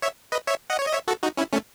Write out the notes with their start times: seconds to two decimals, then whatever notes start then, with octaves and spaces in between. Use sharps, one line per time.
0.02 C#5 E5
0.32 B4 D#5
0.47 C#5 E5
0.70 D#5 F#5
0.79 C#5
0.86 D#5
0.93 C#5 E5
1.08 F#4 A4
1.23 D#4 F#4
1.37 C#4 E4
1.52 A3 C#4